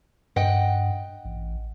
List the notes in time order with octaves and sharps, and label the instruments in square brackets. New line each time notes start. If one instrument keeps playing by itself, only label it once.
[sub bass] G2 [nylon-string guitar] D#5 F#5 G5
[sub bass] A1